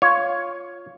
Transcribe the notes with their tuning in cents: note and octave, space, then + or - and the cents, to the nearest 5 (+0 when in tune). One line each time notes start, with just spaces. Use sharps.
F4 +0 C#5 +5